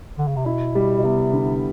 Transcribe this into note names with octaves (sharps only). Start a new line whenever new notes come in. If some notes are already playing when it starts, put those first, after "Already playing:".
D3
C#3
C3
B2 E4
G3
B2
C3 B3
D3